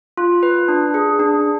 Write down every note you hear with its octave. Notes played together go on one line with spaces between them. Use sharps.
F4
B4
D4
G#4
D4